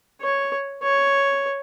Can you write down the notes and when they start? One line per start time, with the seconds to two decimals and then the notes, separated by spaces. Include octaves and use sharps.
0.22 C#5
0.83 C#5